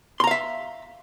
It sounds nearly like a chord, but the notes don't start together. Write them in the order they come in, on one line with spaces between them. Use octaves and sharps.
C6 A#5 F5 E5